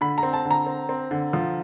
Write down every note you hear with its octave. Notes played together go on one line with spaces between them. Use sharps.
D3 B5
A#5
C4
A5
D3
A#5
C4
C4
D3
F3